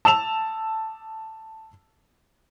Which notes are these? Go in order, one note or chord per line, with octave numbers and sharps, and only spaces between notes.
A5 E6 E7 F7